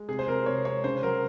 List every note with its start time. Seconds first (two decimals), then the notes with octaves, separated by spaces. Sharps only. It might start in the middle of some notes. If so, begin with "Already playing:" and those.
Already playing: G#3
0.08 C3 G#4
0.19 C5
0.27 C3 A#4
0.46 C3 C#5
0.65 G#3 C#5
0.84 C#3 C5
1.03 F#3 A#4